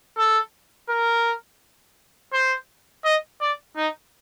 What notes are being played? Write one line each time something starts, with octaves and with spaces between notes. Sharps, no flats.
A4
A#4
C5
D#5
D5
D#4